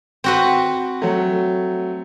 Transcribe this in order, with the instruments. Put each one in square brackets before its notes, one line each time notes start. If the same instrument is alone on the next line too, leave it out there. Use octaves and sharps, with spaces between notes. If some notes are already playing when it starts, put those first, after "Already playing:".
[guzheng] C4 F#4 B4
[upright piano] F#3 A3